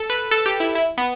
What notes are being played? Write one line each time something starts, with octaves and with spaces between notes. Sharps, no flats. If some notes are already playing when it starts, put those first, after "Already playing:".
Already playing: A4
B4
A4
G4
E4
E4
B3